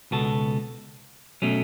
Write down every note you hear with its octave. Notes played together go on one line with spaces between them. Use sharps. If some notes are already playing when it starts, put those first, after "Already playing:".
C#2 B2 B3 F#4 A4
B2 F#3 A3 C#4